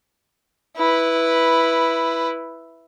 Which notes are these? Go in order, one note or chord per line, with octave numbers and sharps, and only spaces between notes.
E4 B4